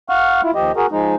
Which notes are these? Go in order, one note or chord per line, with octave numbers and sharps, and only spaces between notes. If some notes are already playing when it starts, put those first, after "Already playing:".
F5 F#5 C#6 F6
E4 F4
D#2 F3 G4 D#5
F#4 G#4 A#4
F3 G#3 D#4